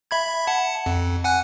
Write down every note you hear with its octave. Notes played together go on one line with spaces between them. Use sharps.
E5 B5 G#6
F#5 A5
F2
F#5 G#5 F#6